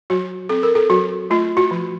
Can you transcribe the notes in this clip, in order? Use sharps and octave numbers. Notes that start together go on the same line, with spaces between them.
F#3 F#4
C4 A4
A#4
A4
F#3 F#4
A3 F4
F#4
F3